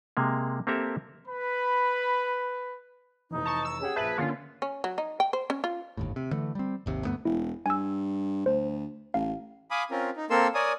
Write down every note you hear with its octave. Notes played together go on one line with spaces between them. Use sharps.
C3 G#3 A#3
A#3 C4 G4 A4 E5 A#5
B4 B5
F1 E3 D#4
A5 A#5 C#6
E6
C#4 G4 G#4 F#5
A#1 B4 E5 A5
D3 A#3 C#4 F4 C#7
C#4
F#3
D#4
G5
C5
C#4
F4
G1 D#2 A2
C3
D3 E3 A3
G3 C4
G#1 D#2 C3
D2 G2 A3 B3
E1 E4
G2 G#5 E6
D2 C5
A1 F5
F5 G#5 B5 D6 D#6
C4 C#4 F4 A#4
D#4
A#3 C4 A4 A#4 C6 E6
A#4 C#5 D5 G#5 D#6